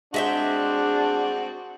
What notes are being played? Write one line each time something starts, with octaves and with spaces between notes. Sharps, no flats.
G#3 C4 D4 F#4 E5 G5